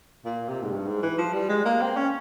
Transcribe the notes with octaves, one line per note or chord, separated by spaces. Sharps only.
A#2
C3
G#2
G2
G#2
E3
F3
G3
G#3
A#3
C4
C#4